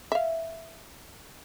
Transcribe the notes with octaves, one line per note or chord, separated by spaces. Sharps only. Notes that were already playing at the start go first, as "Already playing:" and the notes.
E5 F5